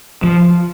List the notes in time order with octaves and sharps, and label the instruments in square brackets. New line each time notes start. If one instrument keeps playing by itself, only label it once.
[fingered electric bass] F3